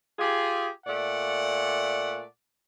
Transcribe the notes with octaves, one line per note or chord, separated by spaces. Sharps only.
F4 G4 G#4
A#2 A3 D5 F#5